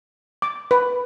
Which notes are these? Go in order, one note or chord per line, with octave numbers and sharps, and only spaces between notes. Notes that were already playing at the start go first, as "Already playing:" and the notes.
D6
B4